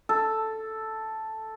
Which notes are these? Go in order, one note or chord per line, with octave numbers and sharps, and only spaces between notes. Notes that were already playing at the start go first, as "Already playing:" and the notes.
A4